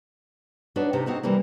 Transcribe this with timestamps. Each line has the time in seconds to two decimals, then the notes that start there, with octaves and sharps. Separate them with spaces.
0.76 D4 D#4 F#4 B4 C#5
0.93 C3 D#4 G4
1.06 C4 D#4 F#4 A4
1.23 C3 E3 G3 A#3